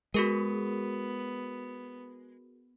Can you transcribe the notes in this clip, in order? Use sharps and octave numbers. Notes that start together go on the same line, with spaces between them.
G#3 B3 F#4 G#4 A#4